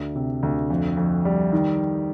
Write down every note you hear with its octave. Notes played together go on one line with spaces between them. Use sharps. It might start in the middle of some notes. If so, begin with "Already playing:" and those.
Already playing: D2
C3
D2
F2
F2
G3
D#3